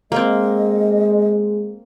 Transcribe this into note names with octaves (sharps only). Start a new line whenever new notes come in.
G#3 A#3 C4 D#5